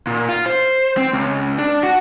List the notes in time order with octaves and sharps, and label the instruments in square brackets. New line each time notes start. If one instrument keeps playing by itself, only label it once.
[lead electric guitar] A#2
F4
C5
C4
C#2
D4
F#4